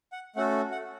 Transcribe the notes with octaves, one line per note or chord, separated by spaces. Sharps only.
F#5
A3 C#4 F#4 A4 F#5
F#5